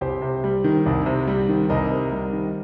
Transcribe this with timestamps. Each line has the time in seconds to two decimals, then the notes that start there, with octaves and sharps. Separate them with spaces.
0.01 C2 G4 C5
0.22 C3
0.44 G3
0.64 D#3
0.86 C2
1.06 C3
1.28 G3
1.49 D#3
1.69 C2 A#4 D#5
1.91 C3
2.12 G3
2.33 D#3